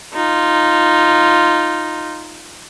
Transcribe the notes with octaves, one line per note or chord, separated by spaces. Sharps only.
D#4 F4